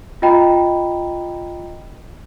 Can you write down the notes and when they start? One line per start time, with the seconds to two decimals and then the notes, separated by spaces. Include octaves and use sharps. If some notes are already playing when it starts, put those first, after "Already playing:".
0.22 F4 D#5 G5 A#5 B5